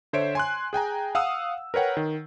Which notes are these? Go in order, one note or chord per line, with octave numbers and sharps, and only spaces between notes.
D3 C5 C#5 E5 D7
G#5 C6 F#6
G#4 G5 G#5 A#5
F5 F#5 D#6 E6
A#4 B4 C#5 F#5 G5
D#3